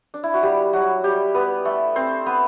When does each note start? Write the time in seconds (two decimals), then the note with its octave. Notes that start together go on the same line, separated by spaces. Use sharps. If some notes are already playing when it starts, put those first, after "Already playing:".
0.14 D4
0.24 E4
0.34 F#4
0.42 G3 G4
0.73 F#3 F#4
1.04 G3 G4
1.34 B3 B4
1.65 A3 A4
1.96 C4 C5
2.26 B3 B4